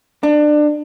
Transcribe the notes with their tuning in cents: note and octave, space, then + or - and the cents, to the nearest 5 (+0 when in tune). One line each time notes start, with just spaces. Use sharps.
D4 +25